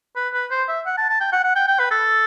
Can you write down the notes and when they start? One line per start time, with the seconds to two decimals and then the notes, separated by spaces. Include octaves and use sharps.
0.16 B4
0.34 B4
0.51 C5
0.68 E5
0.86 F#5
0.98 A5
1.10 A5
1.21 G5
1.32 F#5
1.44 F#5
1.56 G5
1.68 G5
1.79 B4
1.91 A4